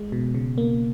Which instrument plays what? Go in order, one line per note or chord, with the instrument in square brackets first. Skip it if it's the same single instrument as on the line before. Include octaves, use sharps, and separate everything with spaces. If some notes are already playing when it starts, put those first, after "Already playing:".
Already playing: [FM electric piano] G#3
B2
C#3
A#3